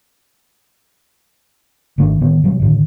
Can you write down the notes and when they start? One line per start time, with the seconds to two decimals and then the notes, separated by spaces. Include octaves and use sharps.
1.98 G#1 D#3 A3 D4
2.21 A2 D#3 B3
2.44 B2 F#3 G3
2.60 D2 A2 D#3